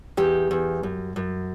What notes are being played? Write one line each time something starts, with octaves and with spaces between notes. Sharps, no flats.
E2 G4
E2
F#2
F#2